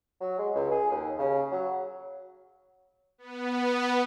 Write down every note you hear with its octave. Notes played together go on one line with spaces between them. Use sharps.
F#3
G#3
C#2
G#4
D#2
C#3
F#3
B3